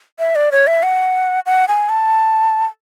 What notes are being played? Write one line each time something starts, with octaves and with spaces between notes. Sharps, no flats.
E5
D5
C#5
E5
F#5
F#5
G#5
A5